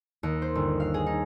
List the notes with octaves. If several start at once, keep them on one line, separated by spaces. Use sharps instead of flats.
D#2
C5
G1
F5
G#4
D#4